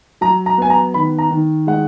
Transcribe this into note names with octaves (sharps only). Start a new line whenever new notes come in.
F#3 A#5
A#5
B3 G#5
A#5
D#3 B5
A#5
D#3
G#3 F#5